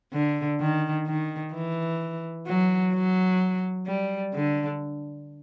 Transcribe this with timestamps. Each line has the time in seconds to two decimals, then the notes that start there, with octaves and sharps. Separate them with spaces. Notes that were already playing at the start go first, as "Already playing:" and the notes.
0.13 D3
0.60 D#3
1.06 D#3
1.53 E3
2.47 F#3
2.94 F#3
3.87 G3
4.33 D3